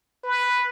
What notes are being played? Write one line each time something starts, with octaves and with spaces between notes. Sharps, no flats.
B4